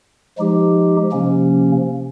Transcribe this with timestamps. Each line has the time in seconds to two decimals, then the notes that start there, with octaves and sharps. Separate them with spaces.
0.38 F3 G#3 D#4 G4
1.12 C3 F3 A#3 C#4